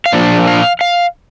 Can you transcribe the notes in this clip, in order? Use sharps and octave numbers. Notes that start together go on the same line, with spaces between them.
F5
A#2 F3 D4 D5
F5
F5